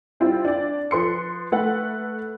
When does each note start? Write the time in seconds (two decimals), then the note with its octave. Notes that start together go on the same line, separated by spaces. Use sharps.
0.20 G3 C4 E4 F4
0.44 D4 D5
0.91 F3 B4 C6 C#7
1.52 A3 B4 F#5